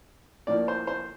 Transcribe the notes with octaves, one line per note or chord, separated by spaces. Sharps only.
A2 F3 A#3 D5
C5
C5